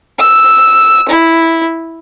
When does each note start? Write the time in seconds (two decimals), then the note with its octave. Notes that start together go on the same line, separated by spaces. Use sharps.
0.19 E6
1.09 E4